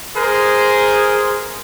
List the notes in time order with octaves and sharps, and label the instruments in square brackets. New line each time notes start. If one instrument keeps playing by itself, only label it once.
[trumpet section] G#4 A#4 C5